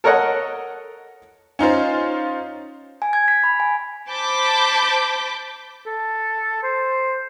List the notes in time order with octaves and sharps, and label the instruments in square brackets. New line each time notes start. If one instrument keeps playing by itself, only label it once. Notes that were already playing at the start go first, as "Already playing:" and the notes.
[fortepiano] A4 A#4 C#5 D#5 F#5
[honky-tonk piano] C#4 D#4 F4 C5
[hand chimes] G#5
G#6
B6
B5
G#5
[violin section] C5 A5 B5 D6 G6 B6
[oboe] A4
C5